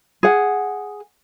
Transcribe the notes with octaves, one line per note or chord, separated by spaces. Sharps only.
G#4 F#5